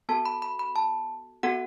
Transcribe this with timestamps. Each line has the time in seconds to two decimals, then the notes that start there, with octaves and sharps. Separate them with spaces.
0.09 B3 F#4 A4 A5
0.26 B5
0.42 B5
0.59 B5
0.76 A5
1.43 B3 F#4 A4 F#5